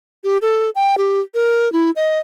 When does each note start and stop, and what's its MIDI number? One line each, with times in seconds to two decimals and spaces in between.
0.24 0.38 67
0.42 0.70 69
0.75 0.96 79
0.98 1.20 67
1.34 1.72 70
1.73 1.91 64
1.96 2.19 75